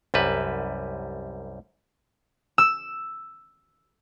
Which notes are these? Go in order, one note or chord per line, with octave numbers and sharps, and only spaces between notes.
C2 F#2 G3 B4
E6